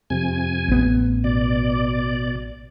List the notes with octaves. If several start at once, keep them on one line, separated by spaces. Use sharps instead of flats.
F2 C3 G#5
A1 B3
B2 D5